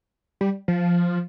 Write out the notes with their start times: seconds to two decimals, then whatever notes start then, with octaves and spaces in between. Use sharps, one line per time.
0.41 G3
0.68 F3